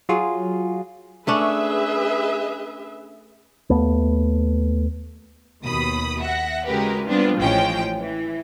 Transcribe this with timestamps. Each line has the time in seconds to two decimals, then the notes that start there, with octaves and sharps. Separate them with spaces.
0.09 F#3 F4 F#4 G#4
1.27 A3 C#4 D4 G#4 B4 E5
3.70 D#2 A3 B3
5.65 D#2 B2 B5 D#6
6.19 E5 F#5 A#6
6.66 C#3 G#3 F#4 G4 A#4 B4
7.06 G3 B3 C4 D4 F4
7.38 A1 F3 G#3 C#4 G5
7.99 E3